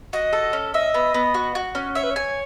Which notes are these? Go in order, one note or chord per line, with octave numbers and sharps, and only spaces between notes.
F#4 D#5
A4
C#4
D#5 E5
B3
B3
F#4
F#4
C#4
C#5 E5
B4
C#5
G#5